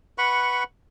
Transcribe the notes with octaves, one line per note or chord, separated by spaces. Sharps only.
B4 F#5 B5 C#6